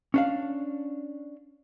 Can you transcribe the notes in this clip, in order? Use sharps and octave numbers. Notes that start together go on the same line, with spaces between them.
C#4 D4 F5